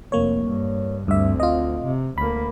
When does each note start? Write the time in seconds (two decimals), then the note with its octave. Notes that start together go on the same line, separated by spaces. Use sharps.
0.12 F1 A#3 C#5
0.44 G2
1.08 D2 G2 C4 E5
1.40 F4 D#5
1.84 C3
2.18 D2 A#3 B5